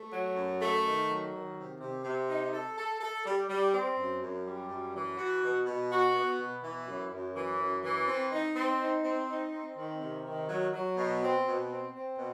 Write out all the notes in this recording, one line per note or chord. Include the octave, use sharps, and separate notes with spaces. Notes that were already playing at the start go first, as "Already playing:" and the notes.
Already playing: A3
F#3
F#2
A3
D#3
F#3
D#3
C3
C3
C3
D#4
A4
A4
A4
G3
G3
C4
F#2
F#2
G3
F#2
E3
F#4
B2
B2
F#4
B3
B2
E3
F#2
F#2
E3
F#2
E3
C4
D#4
C4
D#4
C4
D#4
C4
D#3
C3
D#3
F#3
F#3
B2
C4
B2
C4
C4
B2